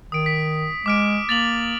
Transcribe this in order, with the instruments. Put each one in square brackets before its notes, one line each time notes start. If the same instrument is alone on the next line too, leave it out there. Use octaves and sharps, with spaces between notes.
[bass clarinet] D#3 [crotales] D#6 D7
[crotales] B6
[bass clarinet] G#3 [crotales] D6 F6 D7
[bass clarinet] A#3 [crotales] A6 F7 F#7